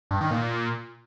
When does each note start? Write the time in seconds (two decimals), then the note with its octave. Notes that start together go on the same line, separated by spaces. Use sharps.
0.11 G2
0.21 D#3
0.31 A#2